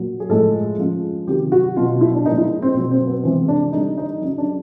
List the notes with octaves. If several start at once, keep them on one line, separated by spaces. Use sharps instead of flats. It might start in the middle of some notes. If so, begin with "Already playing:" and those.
Already playing: A#2 F#3
G#4
A2 F3 G#3 A4
C#3 F3 G#3
C3 D#3 F#3 G4
F#4
B2 F#3 F4
E4
D4
A#2 F3 G#3 D#4
E4
C4
B2 F#3 C4
C4
B3
C3 E3 G#3 C4
D4
D3 G3 D#4
D#4
C#3 F#3 D#4
D4